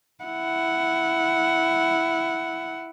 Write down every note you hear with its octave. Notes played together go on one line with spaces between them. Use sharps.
E4 F#5